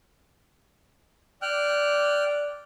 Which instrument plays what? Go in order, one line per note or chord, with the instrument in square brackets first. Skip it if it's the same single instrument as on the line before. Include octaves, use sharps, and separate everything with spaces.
[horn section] D5 [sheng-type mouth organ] G5 F6 F#6